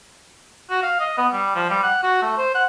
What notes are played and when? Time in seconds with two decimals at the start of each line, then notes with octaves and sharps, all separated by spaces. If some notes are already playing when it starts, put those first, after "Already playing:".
0.70 F#4
0.83 F5
1.00 D#5
1.18 B3
1.33 G3
1.55 F3
1.70 G3
1.83 F#5
2.03 F#4
2.22 A3
2.38 C5
2.54 F#5